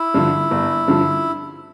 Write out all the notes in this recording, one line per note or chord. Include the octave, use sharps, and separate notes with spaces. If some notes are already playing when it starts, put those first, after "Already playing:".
Already playing: E4
G2 D3 F3
G1
G2 D3 F3